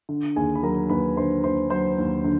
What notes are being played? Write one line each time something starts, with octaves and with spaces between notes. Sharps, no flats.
D3
D#2 G#4 G#5
B5
F#3 A#4 A#5
D#2 B4 B5
D3 C5 C6
D#2 C5 C6
F#3 C5 C6
D#2
D3